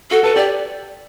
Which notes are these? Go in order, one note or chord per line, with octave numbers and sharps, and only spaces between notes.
F#4 A4
A4 B4
G4 D5